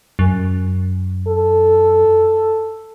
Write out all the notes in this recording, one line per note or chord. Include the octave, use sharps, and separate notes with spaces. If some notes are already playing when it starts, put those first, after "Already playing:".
F#2
A4